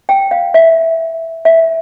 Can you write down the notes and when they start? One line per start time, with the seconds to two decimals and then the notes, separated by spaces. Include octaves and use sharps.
0.09 G5
0.31 F5
0.54 E5
1.45 E5